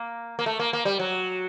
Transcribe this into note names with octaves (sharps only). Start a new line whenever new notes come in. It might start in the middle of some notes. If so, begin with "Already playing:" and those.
Already playing: A#3
A#3
A3
A#3
A#3
G3
F#3